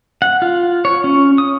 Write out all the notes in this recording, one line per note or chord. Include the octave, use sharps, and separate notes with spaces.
F#5
F4
C#5
C#4
D#6